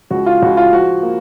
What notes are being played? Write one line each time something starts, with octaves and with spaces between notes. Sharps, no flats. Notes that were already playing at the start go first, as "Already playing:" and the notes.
C#2 F#4
F4
C#2 F#4
F4
F3 F#4
A#3